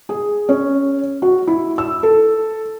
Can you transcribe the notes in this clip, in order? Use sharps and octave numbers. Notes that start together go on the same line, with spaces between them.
G#4
C#4
F#4
E4
E6
A4